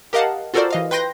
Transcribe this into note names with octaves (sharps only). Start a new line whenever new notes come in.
G4 A#4 D#5 F5 F#5 A5
F4 F#4 A4 A#4 C5 D5
E3 D#5 F5
B4 G5 C6 G6 A#6